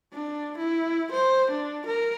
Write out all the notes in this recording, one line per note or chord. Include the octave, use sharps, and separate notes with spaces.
D4
E4
C5
D4
A#4